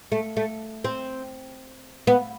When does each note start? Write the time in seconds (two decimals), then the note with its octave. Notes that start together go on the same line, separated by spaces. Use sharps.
0.12 A3
0.37 A3
0.84 C4
2.07 B3